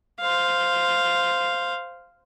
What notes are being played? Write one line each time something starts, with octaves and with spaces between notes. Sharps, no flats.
C5 F5